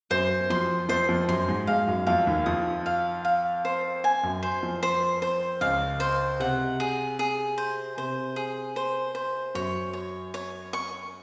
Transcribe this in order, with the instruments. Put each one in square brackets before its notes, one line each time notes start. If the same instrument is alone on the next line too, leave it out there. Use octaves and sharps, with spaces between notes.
[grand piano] F#2 F#3 [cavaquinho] C5
[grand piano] F#3
[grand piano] F2 F3 [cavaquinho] C6
[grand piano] F2 F3 [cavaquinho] C5
[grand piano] F2 F3
[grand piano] F#2 F#3 [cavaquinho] C6
[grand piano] G#2 G#3
[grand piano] G#2 G#3 [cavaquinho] F5
[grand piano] F#2 F#3
[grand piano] F2 F3 [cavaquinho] F5
[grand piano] D#2 D#3
[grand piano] F2 F3 [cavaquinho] D#6
[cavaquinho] F5
F5
C5
G#5
[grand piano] F#2 F#3
[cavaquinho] C5
[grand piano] F2 F3
[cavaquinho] C5
C5
[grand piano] C#2 C#3 [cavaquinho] F5
[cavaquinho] C5
[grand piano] C3 [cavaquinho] F#5
[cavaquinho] G#4
G#4
C5
[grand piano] C3 [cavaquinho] C5
[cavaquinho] G#4
C5
C5
[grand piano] F#2 F#3 [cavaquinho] C#5
[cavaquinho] C#5
C#5
C#6